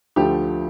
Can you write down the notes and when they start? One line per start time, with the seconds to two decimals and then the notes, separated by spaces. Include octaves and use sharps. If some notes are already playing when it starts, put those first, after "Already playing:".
0.16 D2 D3 F3 A3 G4